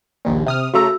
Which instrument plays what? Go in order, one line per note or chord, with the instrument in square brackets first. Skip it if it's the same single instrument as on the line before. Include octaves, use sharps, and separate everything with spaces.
[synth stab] A#1 D#2 A#2
C3 D#6 F6
[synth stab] C#3 A3 A#5 [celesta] F#4 E6